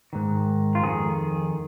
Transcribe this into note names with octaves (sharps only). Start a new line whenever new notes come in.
G#2 D#3
F4
F2 D#3 G#4